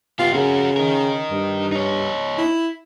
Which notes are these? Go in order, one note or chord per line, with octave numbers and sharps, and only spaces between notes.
B3 F4 G4
C#3 F#4 A#4
D#4 A#4
G2
D#4 C#5
E4